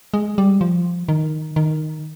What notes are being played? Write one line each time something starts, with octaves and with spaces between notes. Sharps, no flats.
G#3
G3
F3
D#3
D#3